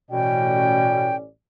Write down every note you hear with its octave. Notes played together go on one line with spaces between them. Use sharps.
A1 B2 C#4 D5 G5